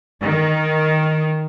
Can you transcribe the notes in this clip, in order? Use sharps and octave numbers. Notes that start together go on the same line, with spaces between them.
D#3